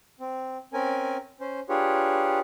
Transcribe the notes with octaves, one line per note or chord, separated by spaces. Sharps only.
C4
C4 C#4 A#4 G#5
C#4 C5
D4 F4 G4 G#4 B4 C#5